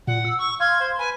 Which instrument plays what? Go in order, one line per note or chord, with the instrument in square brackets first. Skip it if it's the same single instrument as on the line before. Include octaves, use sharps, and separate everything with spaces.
[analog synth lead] A#2 [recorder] F#5
[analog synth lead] E6
[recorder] C#6
[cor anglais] F5 [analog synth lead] C6 [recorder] G#6
[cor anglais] C5
[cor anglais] B4 [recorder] G#5